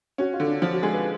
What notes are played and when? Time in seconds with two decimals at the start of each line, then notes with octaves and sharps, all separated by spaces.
0.18 C#4 F#4
0.33 F4
0.40 D3
0.47 D4
0.62 F3 F4
0.73 F#4
0.82 G#3 G#4
0.93 B4